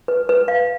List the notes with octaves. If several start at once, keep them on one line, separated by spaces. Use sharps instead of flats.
B4
B4
F5